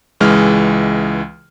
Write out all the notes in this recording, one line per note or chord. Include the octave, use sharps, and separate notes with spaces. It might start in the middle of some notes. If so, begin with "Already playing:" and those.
C#2 E3 G#3 F6